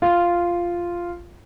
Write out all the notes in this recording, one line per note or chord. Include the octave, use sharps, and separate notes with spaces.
F4